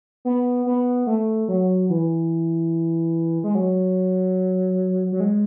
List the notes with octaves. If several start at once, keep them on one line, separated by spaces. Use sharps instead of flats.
B3
B3
A3
F#3
E3
G#3
F#3
F#3
G#3